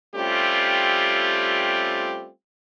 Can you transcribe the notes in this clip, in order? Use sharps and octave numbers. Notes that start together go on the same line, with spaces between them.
G3 A3 C4 C#4 F4 G4